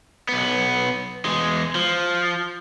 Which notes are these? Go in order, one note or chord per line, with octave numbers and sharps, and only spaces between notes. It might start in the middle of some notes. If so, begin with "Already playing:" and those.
B1 B3
E2 G#3
F3